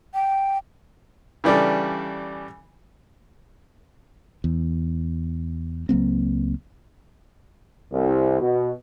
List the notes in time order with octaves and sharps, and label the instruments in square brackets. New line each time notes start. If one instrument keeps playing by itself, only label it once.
[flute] G5
[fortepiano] C#3 E3 G3 D4 A4
[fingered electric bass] E2
C#2 F#3 A#3 C4
[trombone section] C2
B2